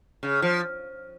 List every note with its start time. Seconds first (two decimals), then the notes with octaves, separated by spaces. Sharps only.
0.23 C#3
0.42 F3